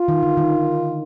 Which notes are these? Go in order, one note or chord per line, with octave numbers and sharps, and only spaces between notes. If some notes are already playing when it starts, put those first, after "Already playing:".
Already playing: F4
D#3
D3
D#3